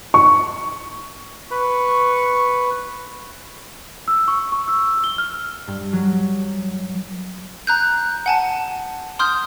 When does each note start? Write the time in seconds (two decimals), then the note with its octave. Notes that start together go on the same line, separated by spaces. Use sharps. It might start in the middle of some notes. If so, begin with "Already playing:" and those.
0.14 C#6
1.51 B4 C#6
4.08 E6
4.28 C#6
4.52 C#6
4.68 E6
5.04 G7
5.18 F6
5.68 G2
5.93 F#3
7.67 A#5 F#6 G6
8.26 F#5 G#5 A5
9.19 C6 D#6 F6 G6